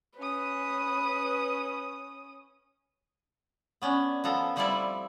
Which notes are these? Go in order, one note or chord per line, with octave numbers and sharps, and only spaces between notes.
C#4 B4 D#6
B3 C#4 D4
F3 B3 A4 A#5
F3 G3 A3 C4 E4 D5